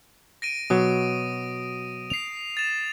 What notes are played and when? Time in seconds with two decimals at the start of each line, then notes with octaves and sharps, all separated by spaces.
0.42 A#6 D7 D#7
0.70 B2 F#3 D#6
2.10 C7 F7
2.57 A6 E7